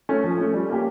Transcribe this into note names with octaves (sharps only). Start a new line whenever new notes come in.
A3 C#4
F3
A3 C#4
G3
A#3 C#4 G4